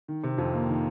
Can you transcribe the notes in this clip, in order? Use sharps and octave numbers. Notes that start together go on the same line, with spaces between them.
D#3
C3
F2
A#3
D#3